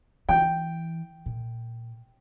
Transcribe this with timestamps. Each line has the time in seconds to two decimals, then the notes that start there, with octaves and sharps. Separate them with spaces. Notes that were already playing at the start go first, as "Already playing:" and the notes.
0.29 E3 G5
1.26 A#2